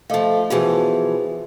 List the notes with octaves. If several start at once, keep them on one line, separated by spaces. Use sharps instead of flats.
F3 A3 A4 D#5 F5
B2 E3 F3 F#4 G#4 B4